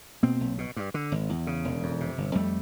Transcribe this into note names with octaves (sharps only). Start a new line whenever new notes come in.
B2 A#3 C4
B1
B2
G2
D3
G#1
E2
C#3
E1
F2
C3
G1
F2 G3 A3